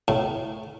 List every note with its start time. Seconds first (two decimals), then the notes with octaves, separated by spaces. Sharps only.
0.08 A2